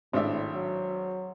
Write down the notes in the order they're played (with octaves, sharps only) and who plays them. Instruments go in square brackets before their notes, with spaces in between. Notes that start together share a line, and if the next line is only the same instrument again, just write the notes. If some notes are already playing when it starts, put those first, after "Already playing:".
[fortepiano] G#1 D4 E5 [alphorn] A2
[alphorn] F#3